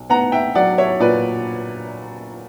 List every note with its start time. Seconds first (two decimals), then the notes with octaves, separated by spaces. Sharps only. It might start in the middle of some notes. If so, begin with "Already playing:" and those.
Already playing: B1
0.10 B3 F#5 A#5
0.32 E5 G5
0.55 F#3 D5 F#5
0.78 C#5 E5
1.00 A#2 B4 D5